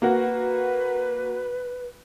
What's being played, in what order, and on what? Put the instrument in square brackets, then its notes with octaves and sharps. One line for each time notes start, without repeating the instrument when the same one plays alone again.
[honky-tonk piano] A#3 F#4 F#5 [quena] B4